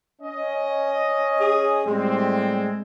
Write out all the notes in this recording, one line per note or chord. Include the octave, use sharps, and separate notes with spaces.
C#4 D#5
G#4
A2 G3 G#3 C4